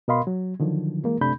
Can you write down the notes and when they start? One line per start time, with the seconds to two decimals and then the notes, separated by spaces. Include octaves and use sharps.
0.08 B2 A#4 D#5 F5 B5 C6
0.27 F#3
0.60 D3 D#3 F3 F#3
1.03 E3 G#3 A#3 A#4
1.21 F#2 C3 A3 D4 B5 G6